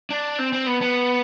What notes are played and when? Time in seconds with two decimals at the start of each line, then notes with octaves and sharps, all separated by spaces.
0.10 D4
0.39 C4
0.53 C4
0.66 B3
0.81 B3